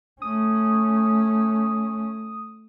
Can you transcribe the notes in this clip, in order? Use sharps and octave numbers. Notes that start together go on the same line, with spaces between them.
A3 C#4 D#6